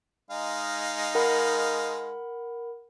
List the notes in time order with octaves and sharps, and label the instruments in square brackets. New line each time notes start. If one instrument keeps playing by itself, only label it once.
[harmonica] G#3 D#4 F5
[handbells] A#4 F#5 B5